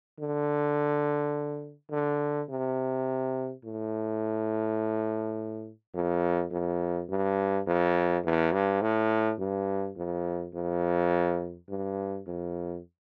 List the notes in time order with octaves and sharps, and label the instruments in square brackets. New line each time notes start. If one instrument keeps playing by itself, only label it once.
[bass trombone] D3
D3
C3
A2
F2
F2
G2
F2
E2
G2
A2
G2
F2
F2
G2
F2